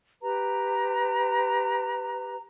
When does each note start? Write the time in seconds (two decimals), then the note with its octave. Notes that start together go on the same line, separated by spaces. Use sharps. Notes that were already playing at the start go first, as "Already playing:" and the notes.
0.23 G4 B4 A#5